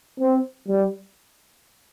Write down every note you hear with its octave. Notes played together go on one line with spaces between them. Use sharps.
C4
G3